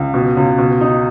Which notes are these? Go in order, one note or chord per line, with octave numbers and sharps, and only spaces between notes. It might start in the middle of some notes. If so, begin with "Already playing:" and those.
Already playing: C#2
B2
C#2
B2
D#4